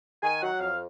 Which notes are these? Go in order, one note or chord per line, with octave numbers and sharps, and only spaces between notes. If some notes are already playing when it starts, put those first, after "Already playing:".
D#3 G#5
F#3 F#5
F2 F5